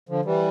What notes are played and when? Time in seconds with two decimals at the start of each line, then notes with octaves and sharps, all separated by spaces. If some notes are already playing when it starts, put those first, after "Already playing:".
0.09 D3 F3
0.25 E3 G3